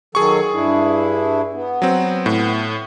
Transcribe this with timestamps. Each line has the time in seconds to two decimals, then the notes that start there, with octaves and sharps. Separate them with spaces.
0.15 D#3 F#3 G#4 A4 C#6
0.53 G2 D4 E4
1.54 B3
1.82 F#3 C4
2.26 A2